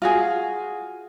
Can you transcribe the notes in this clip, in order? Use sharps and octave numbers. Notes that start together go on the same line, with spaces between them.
F4 F#4 G#4